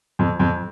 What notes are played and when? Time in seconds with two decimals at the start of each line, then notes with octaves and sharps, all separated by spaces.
0.19 F2
0.39 F2